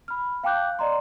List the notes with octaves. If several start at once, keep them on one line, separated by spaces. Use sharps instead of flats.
B5 F6
F5 G5 A5 D6 F#6 G6
D5 D#5 A#5 C6